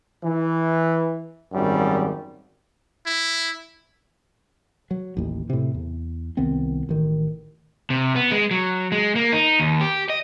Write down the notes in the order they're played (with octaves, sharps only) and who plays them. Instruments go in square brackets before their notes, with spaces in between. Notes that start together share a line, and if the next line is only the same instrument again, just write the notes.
[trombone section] E3
G#1 F#2 G3
[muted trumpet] E4
[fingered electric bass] F#3
A1 D#2
A2 C3
E2
C2 D#3 B3 C4
A1 D#3
[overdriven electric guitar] C3
B3
G#3
F#3
G#3
A#3
D#4
D#2
G4
D#5